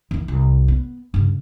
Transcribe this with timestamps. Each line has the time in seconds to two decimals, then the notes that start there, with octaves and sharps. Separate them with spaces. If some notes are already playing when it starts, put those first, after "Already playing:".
0.11 D#3 E3
0.28 C2
0.68 B3
1.14 G2 C#3